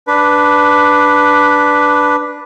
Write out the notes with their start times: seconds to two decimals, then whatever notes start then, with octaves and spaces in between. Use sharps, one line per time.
0.07 D4 B4